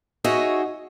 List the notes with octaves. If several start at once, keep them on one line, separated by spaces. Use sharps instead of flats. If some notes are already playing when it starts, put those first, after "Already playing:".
D#4 F#4 G#4 C#5 D#5 E5